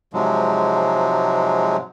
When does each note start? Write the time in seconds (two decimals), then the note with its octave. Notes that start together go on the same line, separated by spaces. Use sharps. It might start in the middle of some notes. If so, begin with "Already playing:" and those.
0.13 G#2 C3 F3 F#3 G#3